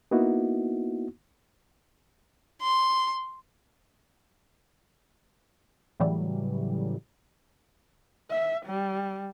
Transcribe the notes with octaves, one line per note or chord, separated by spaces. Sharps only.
A#3 B3 D#4 E4 F#4
C6
A2 C#3 E3 F#3 G3
E5
G3